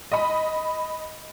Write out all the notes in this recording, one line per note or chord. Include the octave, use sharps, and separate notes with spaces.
D#5 B5